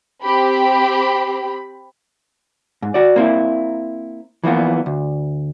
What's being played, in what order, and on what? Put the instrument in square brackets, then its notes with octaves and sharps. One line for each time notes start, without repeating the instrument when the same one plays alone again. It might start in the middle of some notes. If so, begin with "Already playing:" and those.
[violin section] C4 G4 B5
[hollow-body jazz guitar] G#2
F#4 D5
A#3 C4 E4
E3 F3 A#3 B3
D2